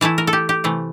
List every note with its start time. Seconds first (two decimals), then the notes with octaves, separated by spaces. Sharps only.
0.01 E3 A3 E4 A5
0.18 A#4
0.27 A4
0.33 G4
0.49 G4
0.64 C3 E3 A3